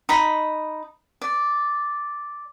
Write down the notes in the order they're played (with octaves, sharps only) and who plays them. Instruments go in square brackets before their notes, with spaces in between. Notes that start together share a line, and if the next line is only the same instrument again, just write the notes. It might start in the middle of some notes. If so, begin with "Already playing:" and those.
[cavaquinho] D#4 A#5 B5
D5